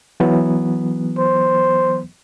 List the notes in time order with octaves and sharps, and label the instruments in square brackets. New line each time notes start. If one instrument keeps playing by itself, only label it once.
[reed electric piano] E3 F#3 B3
[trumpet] C5